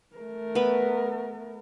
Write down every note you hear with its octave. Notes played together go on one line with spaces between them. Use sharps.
A3 A#4
B3 B4 B5